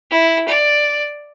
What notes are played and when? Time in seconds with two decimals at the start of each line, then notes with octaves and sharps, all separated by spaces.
0.11 E4
0.48 D5